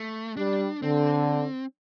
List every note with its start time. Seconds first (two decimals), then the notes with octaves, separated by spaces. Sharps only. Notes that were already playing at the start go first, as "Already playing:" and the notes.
Already playing: A3
0.37 G3 D4
0.82 D3 C4